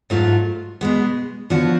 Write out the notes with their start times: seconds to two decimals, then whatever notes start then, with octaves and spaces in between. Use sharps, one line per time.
0.10 G#2 F#3 A3 F4
0.81 B2 G#3 B3
1.50 D3 F3 B3 F#4